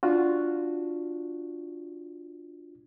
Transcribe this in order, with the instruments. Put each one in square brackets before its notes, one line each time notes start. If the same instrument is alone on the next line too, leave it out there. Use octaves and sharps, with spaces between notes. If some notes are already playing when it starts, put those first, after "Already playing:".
[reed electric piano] D4 F4 F#4